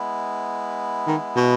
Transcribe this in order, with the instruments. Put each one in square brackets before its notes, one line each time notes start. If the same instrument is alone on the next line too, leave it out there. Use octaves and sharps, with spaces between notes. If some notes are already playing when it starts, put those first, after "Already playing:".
Already playing: [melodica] G#3 B3 E4
[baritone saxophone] D#3
B2